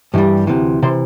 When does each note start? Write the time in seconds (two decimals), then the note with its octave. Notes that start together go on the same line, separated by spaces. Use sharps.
0.14 G2 E3 G3
0.47 D2 C3 E3
0.83 C3 E3 C5